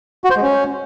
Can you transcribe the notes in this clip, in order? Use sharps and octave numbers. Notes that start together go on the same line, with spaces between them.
F#4
C5
G#3
C#4